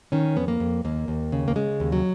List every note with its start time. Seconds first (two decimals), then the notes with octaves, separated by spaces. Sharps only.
0.12 D#3 C#4
0.36 F2 B3
0.48 A#3
0.60 F2
0.85 D#2 A#3
1.08 D#2
1.32 C#3
1.48 A#3
1.56 C#3 G#3
1.80 D#2
1.92 F#3